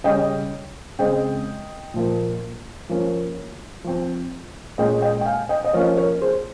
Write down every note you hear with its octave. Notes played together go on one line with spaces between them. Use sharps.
C#3 G3 C#4 D#5 G5
C#3 G#3 C4 D#5 G5
A#2 F3 A#3
F3 A#3 C#4
F3 C4
A#2 G#3 C#4 D#5 G5
D#5 G5
G5
F5 G#5
D#5 G5
D#5
F3 A#3 C#4 C#5 F5
A#4 C#5
G#4 C5